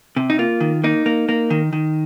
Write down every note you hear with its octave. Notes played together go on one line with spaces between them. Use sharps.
C3
D#4
A#3 F4
D#3
A#3 D#4
A#3
A#3
D#3
D#3